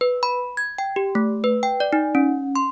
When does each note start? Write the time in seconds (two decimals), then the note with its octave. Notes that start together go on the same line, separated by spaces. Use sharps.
0.01 B4
0.23 B5
0.57 G#6
0.78 G5
0.96 G4
1.15 A3
1.44 B4
1.63 G5
1.80 D5
1.93 D#4
2.15 C#4
2.56 C6